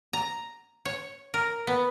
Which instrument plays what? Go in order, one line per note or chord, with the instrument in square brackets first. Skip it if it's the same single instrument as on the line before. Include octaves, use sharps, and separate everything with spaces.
[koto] A#5
C#5
A#4
B3